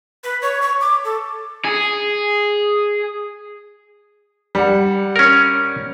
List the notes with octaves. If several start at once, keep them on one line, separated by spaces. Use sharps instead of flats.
B4
C#5
C#6
D6
A4
G#4
G3 F#5
C#4 A#4